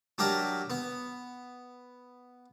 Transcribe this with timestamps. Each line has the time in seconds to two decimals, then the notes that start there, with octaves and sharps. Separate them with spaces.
0.18 F#3 D4 G4 A#4 E5
0.70 B3